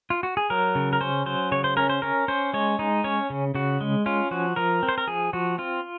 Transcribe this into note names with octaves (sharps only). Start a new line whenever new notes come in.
F4
F#4
G#4
F#3 A#4
C#3
A#4
C#4 C5
F#3 C5
C#3 C#5
C5
C#4 A#4
C5
C#4 A#4
C#4 C5
G#3 C#5
G#3 D#4
C#4 C#5
C#3
C#3 F#4
G#3
C#4 F4
F3 F#4
F3 A#4
C4
C5
A#4
F3 G#4
F3 F#4
C4 F4